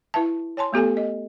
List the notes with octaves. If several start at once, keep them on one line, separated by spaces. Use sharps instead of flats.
E4 B4 E5 A5
C#5 G#5 A5 C6
A3 B3 G4 A4 G#5
D#5